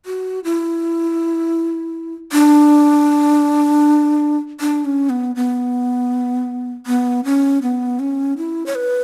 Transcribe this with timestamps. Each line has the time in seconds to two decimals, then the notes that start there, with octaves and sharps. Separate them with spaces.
0.06 F#4
0.44 E4
2.32 D4
4.60 D4
4.85 C#4
5.10 B3
5.36 B3
6.87 B3
7.25 C#4
7.62 B3
8.00 C#4
8.37 E4
8.66 C#5
8.75 B4